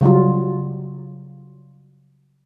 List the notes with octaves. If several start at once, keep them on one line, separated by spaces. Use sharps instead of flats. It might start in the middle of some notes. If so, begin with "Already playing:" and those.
C#3 F#3 G3 F4